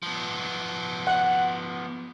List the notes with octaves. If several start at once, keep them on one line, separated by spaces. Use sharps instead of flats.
F3 B3
F#5